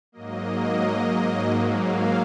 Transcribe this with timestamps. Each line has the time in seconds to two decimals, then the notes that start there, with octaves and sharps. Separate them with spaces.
0.12 G#2 F#3 A#3 D#5
1.41 G#2 F#3 A#3 D#5
1.73 F5